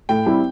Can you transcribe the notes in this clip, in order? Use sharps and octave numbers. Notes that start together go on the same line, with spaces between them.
A2 G5
G3 C4 E4